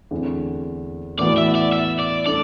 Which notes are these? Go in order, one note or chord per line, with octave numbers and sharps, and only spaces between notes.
E2 D3 A3 C4
A2 E3 B3 F#4 D5
E5
D5
E5
D5
A3 D4 D5